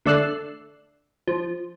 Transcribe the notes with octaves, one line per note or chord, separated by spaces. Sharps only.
D3 A3 D5 E6 F#6 C7
F3